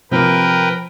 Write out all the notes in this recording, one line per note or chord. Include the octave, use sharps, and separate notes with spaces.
C3 F3 A#3 A#4 B4 G5